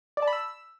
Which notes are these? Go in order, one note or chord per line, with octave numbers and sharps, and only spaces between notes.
D5
A5
B5
E6